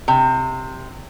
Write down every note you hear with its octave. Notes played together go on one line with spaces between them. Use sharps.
C3